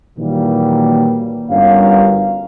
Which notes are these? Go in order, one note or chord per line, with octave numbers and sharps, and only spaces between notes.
A#2 D#3 E3 F#3 G3 A#3
G1 G2 C#4 F#4 A#4 F5